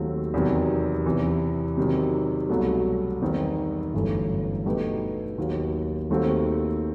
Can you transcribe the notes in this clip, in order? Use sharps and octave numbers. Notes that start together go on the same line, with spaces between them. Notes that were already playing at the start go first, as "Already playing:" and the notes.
Already playing: D#2 D#3 F#3 A3 C4
E2 C3 D#3 F#3
E2 C3 E3
C3 D#3 F#3
C2 B2 F#3 A3
E2 D#3 G3 C4
G1 F#2 E3 A3
B2 A3 D#4 G4 B4
D#2 D#3 F#3
D#2 D#3 A3 C4 F#4